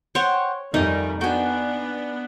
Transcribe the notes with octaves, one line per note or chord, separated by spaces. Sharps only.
C5 C#5 F#5 G5
F2 D#3 G3 D#4 E5 G#5
B3 D4 F#4 G5 G#5